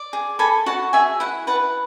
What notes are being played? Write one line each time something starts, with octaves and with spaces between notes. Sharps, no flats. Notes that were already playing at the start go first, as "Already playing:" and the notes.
Already playing: D5
G#4
A4 G#5 B5
F#4 F#5 A5
G#4 E5 G#5
E4 F#5
B4 F#5 A5